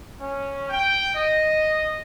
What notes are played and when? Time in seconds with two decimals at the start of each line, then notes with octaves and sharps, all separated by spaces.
0.21 C#4
0.70 G5
1.14 D#5